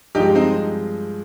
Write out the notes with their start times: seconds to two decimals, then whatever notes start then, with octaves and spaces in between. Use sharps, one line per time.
0.15 G2 F3 G#3 D#4 G4
0.35 C4 D#4